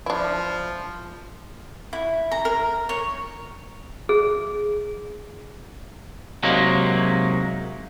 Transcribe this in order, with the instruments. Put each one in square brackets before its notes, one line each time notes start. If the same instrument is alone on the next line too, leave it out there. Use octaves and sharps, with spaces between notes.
[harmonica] F3 [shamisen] D4 E4
[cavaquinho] E4
A#5
A#4
C#5
[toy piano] G#4
[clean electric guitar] C3 F#3 G#3 A#3 D#4